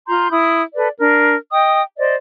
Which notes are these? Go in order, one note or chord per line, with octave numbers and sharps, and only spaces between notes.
F4 A#5 C6 G6
E4 B5 D#6
A4 B4 D5
D4 A#4
D#5 G5 D#6
C5 D5 D#5